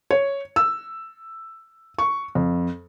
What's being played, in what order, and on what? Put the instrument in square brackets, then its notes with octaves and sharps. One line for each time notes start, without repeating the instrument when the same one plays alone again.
[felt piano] C#5
E6
C#6
F2